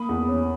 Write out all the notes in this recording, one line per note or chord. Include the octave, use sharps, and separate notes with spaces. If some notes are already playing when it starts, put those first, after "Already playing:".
Already playing: A#3 B5 D#6
E2
C#4